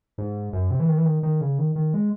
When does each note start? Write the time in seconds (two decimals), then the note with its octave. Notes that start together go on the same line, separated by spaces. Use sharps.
0.18 G#2
0.53 F#2
0.71 C3
0.80 E3
0.89 D#3
0.98 E3
1.05 D#3
1.23 D#3
1.41 C#3
1.58 D#3
1.76 D#3
1.94 G#3